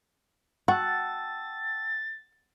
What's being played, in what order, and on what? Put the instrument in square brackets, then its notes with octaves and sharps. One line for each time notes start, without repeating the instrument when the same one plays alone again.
[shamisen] F#4 [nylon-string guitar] F#5 [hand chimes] G5 A5 E6 [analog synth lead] A6